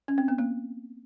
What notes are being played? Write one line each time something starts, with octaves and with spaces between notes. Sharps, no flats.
C#4
C4
B3
A#3